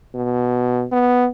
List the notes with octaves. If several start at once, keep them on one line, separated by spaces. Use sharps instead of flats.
B2
B3